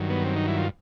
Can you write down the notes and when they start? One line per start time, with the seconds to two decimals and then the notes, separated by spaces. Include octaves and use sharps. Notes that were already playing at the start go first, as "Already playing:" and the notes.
Already playing: G2 D#3 F#3
0.10 B3
0.25 C4
0.36 D#4
0.48 E4
0.58 F4